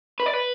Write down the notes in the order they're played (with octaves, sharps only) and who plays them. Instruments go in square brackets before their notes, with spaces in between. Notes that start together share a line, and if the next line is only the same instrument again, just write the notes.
[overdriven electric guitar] B4
D5
B4